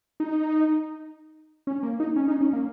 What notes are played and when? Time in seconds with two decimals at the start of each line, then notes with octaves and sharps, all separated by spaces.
0.20 D#4
1.67 C#4
1.83 A#3
2.00 D#4
2.16 C#4
2.28 D#4
2.41 C#4
2.53 A#3